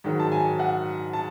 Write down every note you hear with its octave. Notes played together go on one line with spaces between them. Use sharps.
G#2 D#3 F#3
A5
G#5
F#5
A5